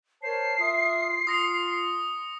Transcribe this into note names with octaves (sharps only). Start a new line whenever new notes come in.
A#4 C5 C#5 A5 C7
F4 E5 D#6
F4 C6 D#6 A#6 C#7